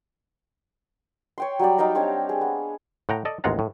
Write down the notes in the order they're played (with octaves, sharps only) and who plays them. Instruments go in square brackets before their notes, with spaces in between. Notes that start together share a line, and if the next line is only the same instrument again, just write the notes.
[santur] C#5 G5 C6
F#3 G3 G4 D5
D#4 F5 G5 A#5
C4 D4 G4 C#5
G#4
B3
[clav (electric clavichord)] A2 F#5 G5 A#5
A4 D5 D#5
A1 D#2 G#3 F4 F#5 A#5
A2